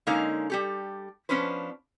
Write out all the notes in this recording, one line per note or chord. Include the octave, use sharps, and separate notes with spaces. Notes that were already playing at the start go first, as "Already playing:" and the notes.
D3 G#3 A#3 C#4 D#4 F5
G3 G4 A4
F3 B3 C#4 D4 B4 C5